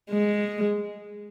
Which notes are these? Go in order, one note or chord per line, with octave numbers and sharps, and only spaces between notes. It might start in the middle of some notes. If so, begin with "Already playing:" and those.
G#3